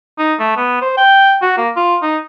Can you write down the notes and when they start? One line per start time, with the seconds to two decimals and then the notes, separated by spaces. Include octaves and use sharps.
0.19 D#4
0.39 A3
0.57 B3
0.81 C5
0.97 G5
1.42 F#4
1.57 A#3
1.76 F4
2.02 D#4